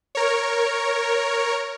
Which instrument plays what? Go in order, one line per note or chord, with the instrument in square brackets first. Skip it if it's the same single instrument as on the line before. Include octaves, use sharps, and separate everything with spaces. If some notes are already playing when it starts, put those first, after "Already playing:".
[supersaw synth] A#4 C#5